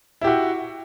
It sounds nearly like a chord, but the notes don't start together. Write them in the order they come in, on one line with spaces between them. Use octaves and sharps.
E4 G4 F#4